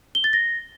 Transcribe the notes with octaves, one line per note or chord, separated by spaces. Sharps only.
G7
A6
A#6